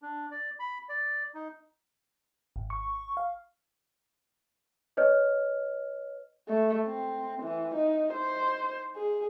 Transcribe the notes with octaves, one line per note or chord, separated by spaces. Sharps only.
D4
D5
B5
D5
D#4
G#1
C#6
F5
B4 C#5 D#5 F6
A3
C4
E3
D#4
C5
G#4